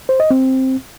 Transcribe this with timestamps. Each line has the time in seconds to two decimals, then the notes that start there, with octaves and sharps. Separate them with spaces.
0.09 C5
0.20 D#5
0.31 C4